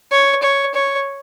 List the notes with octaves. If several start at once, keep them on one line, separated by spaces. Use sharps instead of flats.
C#5
C#5
C#5